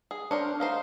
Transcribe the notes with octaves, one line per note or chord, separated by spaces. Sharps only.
G#4
D4 A#4 C5 C#5
A3 D#4 C5 F5